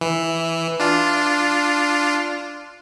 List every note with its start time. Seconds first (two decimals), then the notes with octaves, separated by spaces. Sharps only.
0.01 E3
0.79 D4 F4